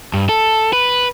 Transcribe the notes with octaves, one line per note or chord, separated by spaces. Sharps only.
G2
A4
B4